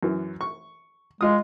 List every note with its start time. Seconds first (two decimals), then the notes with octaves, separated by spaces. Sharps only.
0.03 F#2 E3
0.41 C#6
1.21 G#3 F4 D#6